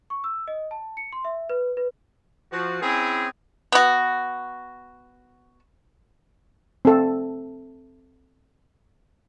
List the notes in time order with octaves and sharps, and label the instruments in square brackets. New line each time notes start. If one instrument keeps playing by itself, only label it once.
[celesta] C#6
E6
D#5
A5
C#7
C6
E5
B4
B4
[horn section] F3 F#4
C4 C#4 E4 G#4
[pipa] B3 F#4
[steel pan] C4 A4